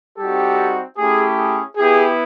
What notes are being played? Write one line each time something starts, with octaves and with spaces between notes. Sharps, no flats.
G3 C4 D#4 F#4 G4 A4
A3 C#4 E4 G4 G#4
G#4
B3 E4 G4 G#4